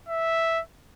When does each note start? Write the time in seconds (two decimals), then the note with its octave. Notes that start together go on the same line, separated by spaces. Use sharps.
0.09 E5